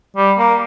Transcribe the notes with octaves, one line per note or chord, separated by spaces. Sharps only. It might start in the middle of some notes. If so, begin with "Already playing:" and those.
G3
A#3